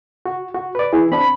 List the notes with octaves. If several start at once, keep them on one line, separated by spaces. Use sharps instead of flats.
F#4
F#4
B4 D5
E3 E4 G#4
C4 D4 B5